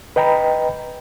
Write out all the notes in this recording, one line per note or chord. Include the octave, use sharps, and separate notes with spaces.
B4 D#5 G5 A#5 B5